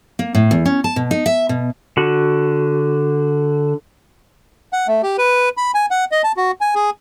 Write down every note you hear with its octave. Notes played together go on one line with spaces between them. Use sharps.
A#3
A2
E2
C#4
A5
B2
D#4
E5
B2
D3 F#4
F#5
A3
G4
B4
B5
G#5
F#5
D#5
A5
F#4
G#5
G#4